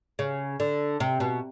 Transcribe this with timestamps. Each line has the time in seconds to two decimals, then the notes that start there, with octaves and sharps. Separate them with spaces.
0.19 C#3
0.60 D3
1.00 C3
1.20 B2